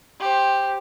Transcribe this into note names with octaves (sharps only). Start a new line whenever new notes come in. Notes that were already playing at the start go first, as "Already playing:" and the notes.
G4 C5